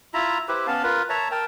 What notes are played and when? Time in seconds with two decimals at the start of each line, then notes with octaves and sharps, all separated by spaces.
0.14 E4 F4 E5 A#5
0.48 E4 G4 B4 C5
0.67 B3 C#4 F5 A5
0.83 F4 A#4 B4
1.09 C#5 E5 A5 A#5
1.31 A#4 G5 A5